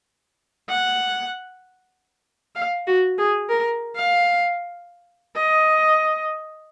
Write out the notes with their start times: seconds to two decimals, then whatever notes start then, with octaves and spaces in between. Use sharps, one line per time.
0.69 F#5
2.55 F5
2.87 F#4
3.18 G#4
3.49 A#4
3.96 F5
5.36 D#5